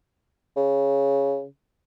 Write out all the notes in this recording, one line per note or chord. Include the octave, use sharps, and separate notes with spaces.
C#3